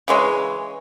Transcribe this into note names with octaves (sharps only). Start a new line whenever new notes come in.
C#3 E3 G#3 C#5